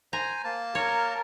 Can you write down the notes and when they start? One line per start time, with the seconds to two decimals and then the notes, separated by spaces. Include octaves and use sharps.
0.13 C5 G#5 A#5
0.44 A#3 A5
0.75 A#4 C#5